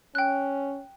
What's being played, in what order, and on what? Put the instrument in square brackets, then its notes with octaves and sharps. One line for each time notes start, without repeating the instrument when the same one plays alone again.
[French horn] C#4 [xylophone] G5 F#6